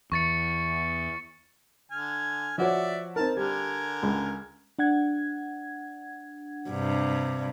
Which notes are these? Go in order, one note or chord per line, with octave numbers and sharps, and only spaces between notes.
E2 C#6 A6 C#7
D3 G#5 F6
F3 F#4 C#5 D5 E5
C4 D#4 A#4 A5
D3 G3 A#4 G#5
C#2
D4 F#5 G#6
G2 C3